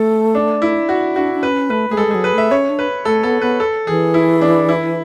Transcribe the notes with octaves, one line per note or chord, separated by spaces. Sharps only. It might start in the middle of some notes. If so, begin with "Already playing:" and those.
Already playing: A3 A4
D4
E4
F#4
D4 F#4
D4
C#4 B4
A3 B4
A3 G#4
G#3 A4
G#3
F#3 G#4
B4
A3 E5
C#4 C#5
D4
B4
A3 A4
B3 A4
B3 B4
A4
E3 G#4
E4
D4
E4